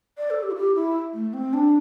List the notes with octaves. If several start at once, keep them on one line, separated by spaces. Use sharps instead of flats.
D5
A4
G4
E4
G4
E4
A3
C4
D4